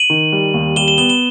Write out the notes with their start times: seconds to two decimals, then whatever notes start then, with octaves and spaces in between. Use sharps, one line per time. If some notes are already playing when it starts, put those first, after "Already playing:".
Already playing: D#7 F#7
0.10 D#3
0.32 G3
0.54 D#2
0.76 G3 E7 G7
0.88 E7 G7
0.98 B3 E7 G7
1.09 E7 G7